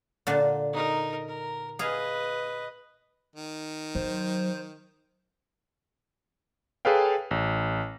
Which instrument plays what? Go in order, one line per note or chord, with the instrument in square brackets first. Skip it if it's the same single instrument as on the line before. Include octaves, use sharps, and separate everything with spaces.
[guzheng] A#2 D3 D4
[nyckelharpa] D#4 A#4
A#4
[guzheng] G#4 F5 [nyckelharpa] B4 D#5
[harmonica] D#3
[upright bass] F#3 [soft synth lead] C5
[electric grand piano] G#4 A4 B4 C#5 F5 G5
A1